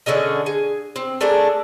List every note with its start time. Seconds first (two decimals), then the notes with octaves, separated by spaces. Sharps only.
0.06 D3 C#4 G#4 D#5
0.46 G#4
0.96 C4
1.21 A3 D4 G#4 A#4